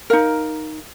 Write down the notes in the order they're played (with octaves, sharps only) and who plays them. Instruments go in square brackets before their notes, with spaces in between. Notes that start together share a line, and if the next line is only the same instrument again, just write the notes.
[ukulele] D#4 A#4 F5